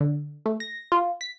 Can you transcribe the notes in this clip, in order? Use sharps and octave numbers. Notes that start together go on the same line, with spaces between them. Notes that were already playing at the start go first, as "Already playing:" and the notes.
D3
A3
A#6
F4
B6